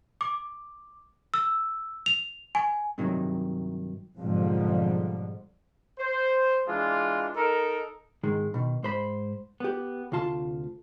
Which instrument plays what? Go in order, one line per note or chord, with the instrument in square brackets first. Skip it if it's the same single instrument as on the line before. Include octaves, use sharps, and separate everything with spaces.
[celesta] D6
E6
F7
G#5
[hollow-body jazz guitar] G2 C3 D#3 F#3
[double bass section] B1 F2 G#2 D3 F3 G3
[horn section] C5
E3 G#3 D4 F4
D#4 A4 A#4
[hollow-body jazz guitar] G#2 D#3 G#3
B2 D#3
G#2 C5 B5
B3 G4
D2 C3 F4 A5 C6